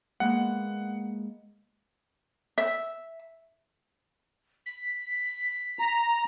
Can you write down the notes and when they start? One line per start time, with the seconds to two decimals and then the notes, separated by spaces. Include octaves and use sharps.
0.20 G#3 A#3 B3 F#5
2.58 E5
4.66 B6
5.79 A#5